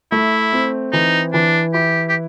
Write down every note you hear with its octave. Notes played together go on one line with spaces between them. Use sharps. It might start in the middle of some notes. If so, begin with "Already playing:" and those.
A3 E4
C4
E3 D#4
E3 D4
E4 G4
G4